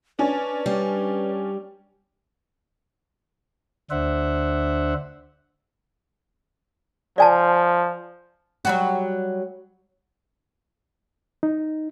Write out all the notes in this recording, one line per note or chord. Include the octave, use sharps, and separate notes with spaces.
C#4 D4 B4
G3
D2 D4 C5 E5 F#5
F3 D5 G#5 A5
F#3 G3 F#4
D#4